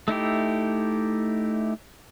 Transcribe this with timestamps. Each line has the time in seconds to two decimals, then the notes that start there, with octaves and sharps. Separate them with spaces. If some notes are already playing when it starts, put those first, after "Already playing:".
0.08 A3 D#4 E4 G4